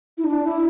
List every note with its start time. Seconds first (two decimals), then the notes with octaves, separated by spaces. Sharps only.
0.18 E4
0.24 D4
0.44 E4